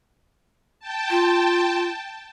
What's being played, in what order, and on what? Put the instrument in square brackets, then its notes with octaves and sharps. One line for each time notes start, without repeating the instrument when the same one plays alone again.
[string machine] G5 A5
[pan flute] F4